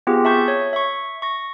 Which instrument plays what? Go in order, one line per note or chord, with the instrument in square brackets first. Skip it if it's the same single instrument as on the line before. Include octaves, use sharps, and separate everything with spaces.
[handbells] B3 C4 F4 G4 G#4
E5 A5 C#6 G6
C#5
E5 C#6
C#6 A#6